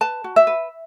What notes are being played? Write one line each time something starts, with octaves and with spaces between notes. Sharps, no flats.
B4 A5
F#4
E5
B4